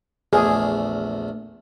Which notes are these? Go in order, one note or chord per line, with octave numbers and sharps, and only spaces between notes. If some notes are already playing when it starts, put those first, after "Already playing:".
A#1 E2 A3 G#4